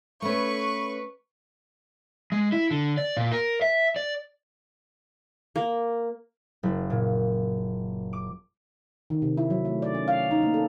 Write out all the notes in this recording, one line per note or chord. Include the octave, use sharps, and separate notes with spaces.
A3 C#4 B4 C#6
G#3
E4
D3
D5
A#2
A#4
E5
D5
A#3
F#1
A#2
D6
D#3
C3
E4
F#3
A3
D5
C#4
F5
D#4
A#3
A4